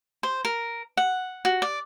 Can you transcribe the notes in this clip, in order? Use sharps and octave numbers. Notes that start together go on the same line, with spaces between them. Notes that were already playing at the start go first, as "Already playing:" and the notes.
C5
A#4
F#5
F#4
D5